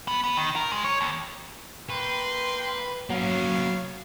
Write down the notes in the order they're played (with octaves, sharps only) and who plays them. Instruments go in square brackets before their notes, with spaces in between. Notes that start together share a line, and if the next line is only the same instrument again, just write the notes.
[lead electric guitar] B3
B3
D#3
A#4
G#3
C#5
D#2
[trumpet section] A#3 G5 C6 [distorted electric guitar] B4
[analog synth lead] F#3 [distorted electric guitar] A#3 C#4 [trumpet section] B3 C#5 F5